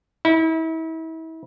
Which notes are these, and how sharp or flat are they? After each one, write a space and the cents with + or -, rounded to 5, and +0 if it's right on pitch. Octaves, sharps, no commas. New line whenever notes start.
E4 -35